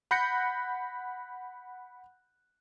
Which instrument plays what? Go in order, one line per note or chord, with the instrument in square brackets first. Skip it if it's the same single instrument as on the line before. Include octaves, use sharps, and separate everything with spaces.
[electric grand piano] F#5 B5 F#6 G6 A#6 C#7